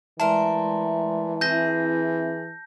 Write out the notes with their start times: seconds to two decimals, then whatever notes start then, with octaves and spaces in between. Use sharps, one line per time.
0.20 E3 G#3 A3 A#4 D5 A5 C6
1.41 C4 E4 G#4 E5 G6 A#6